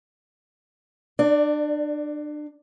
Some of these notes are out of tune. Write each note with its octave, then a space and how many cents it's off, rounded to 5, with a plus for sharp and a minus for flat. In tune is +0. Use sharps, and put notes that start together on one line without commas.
D4 +30 D5 +0